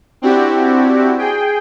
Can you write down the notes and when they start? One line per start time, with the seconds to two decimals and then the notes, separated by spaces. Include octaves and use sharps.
0.22 C4 D4 E4 F#4 G4
1.18 G#4 G5